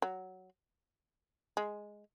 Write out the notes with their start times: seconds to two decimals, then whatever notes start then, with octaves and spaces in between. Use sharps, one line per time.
0.02 F#3
1.57 G#3